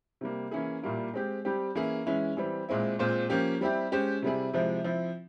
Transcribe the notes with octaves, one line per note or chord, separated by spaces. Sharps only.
C3 G3 A#3
E3 A#3 C#4 E4 G#4
A#2 G3 A#3 E4
G#3 C4 G4
G3 C4 G4
E3 A#3 C#4 E4 G#4
E3 G#3 C#4 E4
E3 G3 C4
A#2 G#3 C4 E4
A#2 G#3 C4 F4 C5
F3 A#3 C#4 G4
G3 C4 E4 G4
G#3 C#4 G4 C5
C3 G3 C4 E4 G#4
C3 F3 G#3 E4
F3 C4 E4